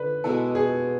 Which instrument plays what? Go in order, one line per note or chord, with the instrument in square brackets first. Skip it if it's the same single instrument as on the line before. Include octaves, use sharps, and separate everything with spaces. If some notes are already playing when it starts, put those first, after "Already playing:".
Already playing: [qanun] D3 [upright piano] B4
[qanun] B2 G#3 B3 E4 [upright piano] A4
[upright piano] G#4